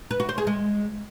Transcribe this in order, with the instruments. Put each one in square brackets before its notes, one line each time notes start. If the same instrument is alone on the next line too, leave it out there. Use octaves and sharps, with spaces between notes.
[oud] B4
F#4
C5
G#4
G#3